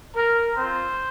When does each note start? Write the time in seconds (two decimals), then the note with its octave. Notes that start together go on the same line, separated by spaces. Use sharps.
0.16 A#4
0.55 C4 F4 C5